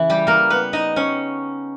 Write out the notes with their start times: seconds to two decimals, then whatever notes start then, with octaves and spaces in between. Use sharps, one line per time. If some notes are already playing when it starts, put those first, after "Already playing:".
Already playing: C#3 E3 E4
0.10 G3 G4
0.27 A#3 A#4
0.50 B3 B4
0.73 D#4 D#5
0.96 C#4 C#5